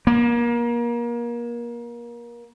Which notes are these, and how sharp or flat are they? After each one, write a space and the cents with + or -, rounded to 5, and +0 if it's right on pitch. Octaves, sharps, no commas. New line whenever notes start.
A#3 +30